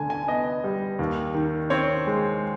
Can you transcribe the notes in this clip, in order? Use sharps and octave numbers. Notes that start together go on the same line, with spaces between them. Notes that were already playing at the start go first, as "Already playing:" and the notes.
Already playing: D2 D3 G#5 A5
G#5
B3 D#5
G3
D#2
D#3
C4 C#5
G#3